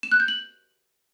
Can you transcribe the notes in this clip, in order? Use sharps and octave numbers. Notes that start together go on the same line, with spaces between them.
E7
F#6
G6
F#7